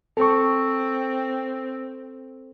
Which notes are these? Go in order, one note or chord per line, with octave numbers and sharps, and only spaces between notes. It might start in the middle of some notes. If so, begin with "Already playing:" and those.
C4 A4 C#6